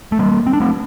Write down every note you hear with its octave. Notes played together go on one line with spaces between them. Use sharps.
A3
G3 A#3
C4
D4
A3 C4